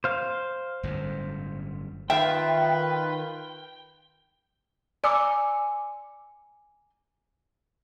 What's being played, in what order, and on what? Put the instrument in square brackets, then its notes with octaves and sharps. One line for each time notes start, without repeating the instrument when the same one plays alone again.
[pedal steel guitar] C5 F5
[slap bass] G1 F#2 A2
[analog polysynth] D#3 F4 [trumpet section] B4 [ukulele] E5 [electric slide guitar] G5
[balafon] D5 [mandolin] G#5 A#5 C6 [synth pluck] D6 E6 C#7